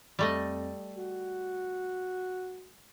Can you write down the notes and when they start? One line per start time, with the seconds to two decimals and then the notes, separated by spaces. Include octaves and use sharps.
0.19 F2 G3 A3 D#5
0.97 F#4